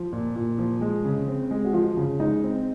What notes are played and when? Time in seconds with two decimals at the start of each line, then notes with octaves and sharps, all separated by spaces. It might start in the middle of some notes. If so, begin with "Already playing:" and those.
Already playing: F3
0.13 A#2
0.36 A#2
0.59 F3
0.81 G#3
1.05 C#3
1.28 C4
1.51 G#3
1.65 F#4
1.73 F3 F4
1.97 C#3
2.20 G#3 D#4
2.43 C4